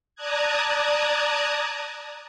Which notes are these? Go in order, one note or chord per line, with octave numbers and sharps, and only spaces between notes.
D5 A5 A#5 D#6 F#6 G#6